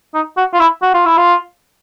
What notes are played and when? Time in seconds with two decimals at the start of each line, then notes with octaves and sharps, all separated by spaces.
0.14 D#4
0.37 F#4
0.53 F4
0.60 E4
0.82 F#4
0.94 F4
1.06 E4
1.17 F4